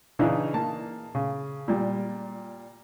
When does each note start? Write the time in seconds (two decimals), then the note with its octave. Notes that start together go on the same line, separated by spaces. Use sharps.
0.19 C#3 E3 D4 D#4
0.54 A#3 A5
1.15 C#3
1.68 A#2 G3